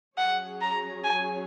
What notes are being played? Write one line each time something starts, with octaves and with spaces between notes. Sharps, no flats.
F#3 C#4 G#4 C#5 F#5
A#5
G#5